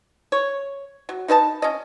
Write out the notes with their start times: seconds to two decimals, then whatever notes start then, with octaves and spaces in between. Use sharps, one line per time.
0.32 C#5
1.09 F#3
1.28 D#4 B4 D#5 A5
1.62 C#4 D#5